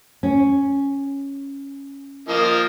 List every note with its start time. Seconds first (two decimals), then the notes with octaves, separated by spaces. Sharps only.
0.23 C#4
2.29 F3 A#3 D#5